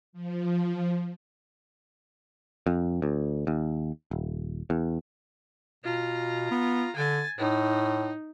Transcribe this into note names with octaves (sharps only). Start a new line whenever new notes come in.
F3
F2
D2
D#2
D#1
E2
B2 F4 A#5
B3
D3 G#5 A6
A2 D#4